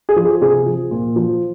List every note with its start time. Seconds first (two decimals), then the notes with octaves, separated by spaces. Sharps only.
0.09 G#4
0.16 F3
0.24 G#4
0.42 C3 G#4
0.66 F3
0.91 A#2
1.16 F3